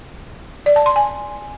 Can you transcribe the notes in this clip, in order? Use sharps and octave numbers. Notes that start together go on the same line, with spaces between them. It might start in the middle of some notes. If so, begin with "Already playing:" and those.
D5
A5
C6
G#5